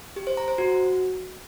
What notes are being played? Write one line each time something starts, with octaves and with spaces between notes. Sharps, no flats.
G4
C5
A#5
C5
F#4